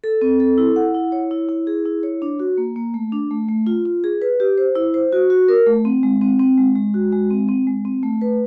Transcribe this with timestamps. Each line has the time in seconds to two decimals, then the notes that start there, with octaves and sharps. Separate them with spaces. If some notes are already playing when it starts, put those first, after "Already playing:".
0.04 A4
0.22 C4
0.40 A4
0.58 E4
0.76 F#5
0.94 E4
1.12 C#5
1.31 E4
1.49 E4
1.67 G#4
1.85 E4
2.03 C#5
2.22 D4
2.39 F#4
2.58 A#3
2.76 A#3
2.94 A3
3.12 D4
3.31 A3
3.48 A3
3.67 F4
3.85 F4
4.04 G#4
4.22 B4
4.40 G4
4.58 C5
4.76 E4
4.94 C5
5.13 F#4
5.30 F#4
5.48 A#4
5.67 A3
5.85 C4
6.03 G#3
6.21 C4
6.39 C4
6.58 G#3
6.76 G#3
6.94 F#4
7.12 G#3
7.31 C4
7.48 C4
7.67 G#3
7.85 C4
8.03 A3
8.22 B4